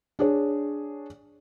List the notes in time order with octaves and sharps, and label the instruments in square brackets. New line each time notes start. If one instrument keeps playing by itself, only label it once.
[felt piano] D4 G#4 C#5